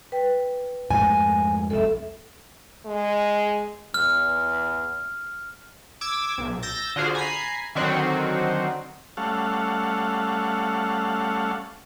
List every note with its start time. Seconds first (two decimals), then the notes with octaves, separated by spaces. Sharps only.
0.12 B4 G5
0.90 F2 G#2 A3 G#5
1.70 B1 F2 G#3 A4 E5
2.86 G#3
3.94 E2 F6
6.01 D6 E6 G#6
6.38 B1
6.63 E6 G6 A6 A#6
6.96 D3 F4 F#4 G#4 C5
7.15 G#5 A#5 B5 C7
7.75 D3 D#3 F#3 C4 F#4
9.17 G3 A3 C#4 A4 F5 F#5